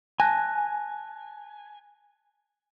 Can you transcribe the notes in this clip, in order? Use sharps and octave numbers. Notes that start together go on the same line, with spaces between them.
G#5 A5 F#6 A#6